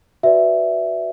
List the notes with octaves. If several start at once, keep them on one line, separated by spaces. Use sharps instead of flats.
F#4 B4 D5 E5